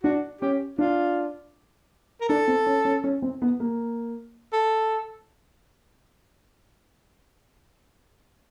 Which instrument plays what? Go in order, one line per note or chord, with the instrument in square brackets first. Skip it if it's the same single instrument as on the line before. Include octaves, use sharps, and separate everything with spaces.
[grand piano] D4 [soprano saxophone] F#4
[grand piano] C#4 [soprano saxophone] G4
[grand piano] D4 [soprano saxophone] F4
[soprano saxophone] A#4
[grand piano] D4 [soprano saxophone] A4
[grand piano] C4
C#4
C#4
C#4
C4
B3
A#3
[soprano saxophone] A4